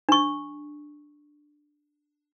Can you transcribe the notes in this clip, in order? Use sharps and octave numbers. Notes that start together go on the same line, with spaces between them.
D4 C#6